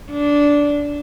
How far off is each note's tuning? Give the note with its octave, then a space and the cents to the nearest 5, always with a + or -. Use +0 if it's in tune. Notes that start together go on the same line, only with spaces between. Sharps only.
D4 -15